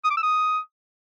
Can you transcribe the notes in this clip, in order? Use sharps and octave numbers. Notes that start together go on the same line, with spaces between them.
D#6
D6
E6
D#6